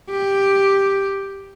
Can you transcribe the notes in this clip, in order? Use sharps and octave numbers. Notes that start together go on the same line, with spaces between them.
G4